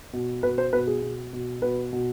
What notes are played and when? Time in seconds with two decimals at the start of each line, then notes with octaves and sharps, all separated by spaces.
0.13 B2
0.43 B2 B4
0.58 C5
0.73 B2 B4
0.87 G#4
1.02 B2
1.33 B2
1.62 B2 B4
1.93 B2